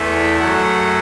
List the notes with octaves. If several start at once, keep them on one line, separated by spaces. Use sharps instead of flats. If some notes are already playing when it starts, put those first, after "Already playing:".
Already playing: E2 E3 A3 E5
F#2 F#3 A3 F#5